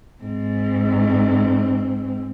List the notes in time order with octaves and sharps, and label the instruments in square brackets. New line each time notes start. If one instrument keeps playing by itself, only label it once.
[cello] G#2 C4